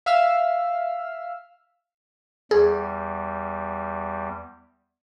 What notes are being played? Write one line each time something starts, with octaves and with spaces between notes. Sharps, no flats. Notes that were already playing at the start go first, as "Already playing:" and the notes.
E5 F5 E6 F6
E2 G3 G#4